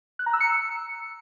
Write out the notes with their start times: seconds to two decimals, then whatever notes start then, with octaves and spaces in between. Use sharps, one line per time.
0.19 F#6
0.26 A#5
0.33 E6
0.40 C#7